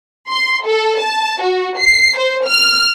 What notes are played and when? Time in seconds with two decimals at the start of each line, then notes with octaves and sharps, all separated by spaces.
0.29 C6
0.64 A4
1.01 A5
1.40 F#4
1.78 C7
2.18 C5
2.47 F6